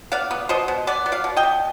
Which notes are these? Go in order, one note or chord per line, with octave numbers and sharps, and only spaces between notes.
B3 D5 F5
B3
B2 C5 D#5
B2
B3 B4 D5
B3
D5 F5
B2
D#5 G5
B2